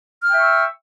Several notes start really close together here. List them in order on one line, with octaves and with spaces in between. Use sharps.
F6 G5 E5 C#6 E6